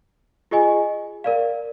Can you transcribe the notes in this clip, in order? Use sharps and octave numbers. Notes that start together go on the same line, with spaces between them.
F4 G#4 D#5 G#5
A#4 D5 F5